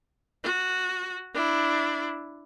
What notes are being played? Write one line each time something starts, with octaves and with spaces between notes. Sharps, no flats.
F#4
D4 E4